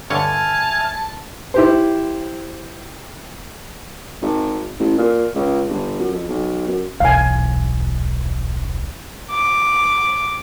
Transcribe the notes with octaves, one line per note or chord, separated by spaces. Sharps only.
G2 D3 C#5 E5 G#5 A5 F6
E4 G4 C5
G#1
A1
A#2
C#2
G1
F#2
F2
B1
F#2
D#1 B1 E2 F5 G#5
D6